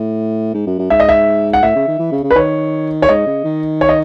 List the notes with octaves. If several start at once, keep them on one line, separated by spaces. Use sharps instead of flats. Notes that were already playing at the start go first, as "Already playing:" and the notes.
Already playing: A2
G#2
F#2
F#2
G#2 E5
D#5
E5
F#5
A2 E5
C#3
D#3
E3
C#3
C#3
B4
D#3 C#5
C#5
G#2 D#5
C#3
D#3
C#5
D#5